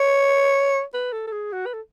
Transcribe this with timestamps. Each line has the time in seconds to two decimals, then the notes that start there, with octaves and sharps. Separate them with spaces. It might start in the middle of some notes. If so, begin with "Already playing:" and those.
Already playing: C#5
0.94 B4
1.12 A4
1.27 A4
1.32 G#4
1.53 F#4
1.66 B4
1.73 A4